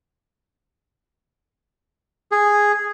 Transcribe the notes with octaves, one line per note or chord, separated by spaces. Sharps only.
G#4